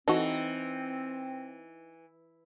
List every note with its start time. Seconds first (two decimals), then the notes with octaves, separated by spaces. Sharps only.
0.08 E3 C4 D#4 F#4 A4